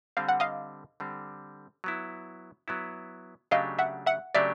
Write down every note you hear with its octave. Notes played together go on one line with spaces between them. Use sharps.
D3 G3 C4 F5
F#5
D#5 F5
D3 G3 C4
F#3 B3 E4
F#3 B3 E4
C#3 F#3 A3 D4 G4 D#5 F5
E5 F#5
E5 F#5
C#3 F#3 A3 D4 G4 D5 E5